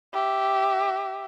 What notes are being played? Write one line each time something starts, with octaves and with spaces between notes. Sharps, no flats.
G4 E5